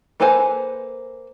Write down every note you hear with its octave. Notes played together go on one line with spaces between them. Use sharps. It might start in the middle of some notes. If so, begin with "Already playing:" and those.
A#3 A4 B4 C5 G#5